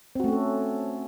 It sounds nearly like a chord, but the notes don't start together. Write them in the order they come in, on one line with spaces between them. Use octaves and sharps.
C4 F#4 A3 C#4 A4